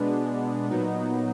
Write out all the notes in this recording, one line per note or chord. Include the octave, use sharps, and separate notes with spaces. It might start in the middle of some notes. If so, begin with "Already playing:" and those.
Already playing: B2 G#3 B3 D4
A#2 F#3 B3 D#4